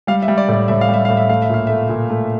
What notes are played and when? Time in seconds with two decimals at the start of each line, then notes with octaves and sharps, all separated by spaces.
0.07 G3 F5
0.22 E5
0.28 G3
0.38 D5
0.48 A2 D5
0.68 A2 E5
0.81 F5
0.89 G3
0.94 E5
1.05 A2 F5
1.17 E5
1.29 A3 F5
1.42 E5
1.50 A#2 F5
1.67 A3 E5
1.89 A#2
2.10 A3